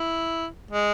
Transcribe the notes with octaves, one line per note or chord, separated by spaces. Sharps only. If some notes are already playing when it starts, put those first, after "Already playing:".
Already playing: E4
G#3